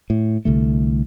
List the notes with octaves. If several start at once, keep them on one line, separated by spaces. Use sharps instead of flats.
A2
C2 D3 A3